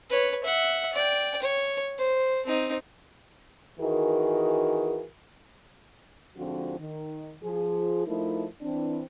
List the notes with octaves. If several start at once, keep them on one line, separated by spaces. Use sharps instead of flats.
B4 C#5
E5 F#5
D5 G5
C#5
C5
C4 D#4
D#3 E3 F#4 G#4 A#4
G#2 D3 F3 C4 F4 F#4
D#3
F3 G#4
F3 A3 D#4 E4 A#4
E3 C4 D4